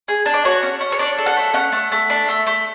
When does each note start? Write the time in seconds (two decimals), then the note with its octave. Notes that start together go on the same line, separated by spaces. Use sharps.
0.08 G#4
0.26 D4
0.34 D5
0.45 F#4 C#5
0.63 C#4
0.81 C#4
0.92 C#5
0.99 D4 D5
1.18 A4
1.26 F#5
1.37 A3
1.54 C#4 F#5
1.72 A3
1.92 A3
2.10 D4
2.28 A3
2.47 A3